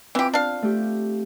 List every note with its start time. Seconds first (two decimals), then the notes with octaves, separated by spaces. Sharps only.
0.15 E3 C4 F4 G4
0.34 D4 F5
0.63 A3 G4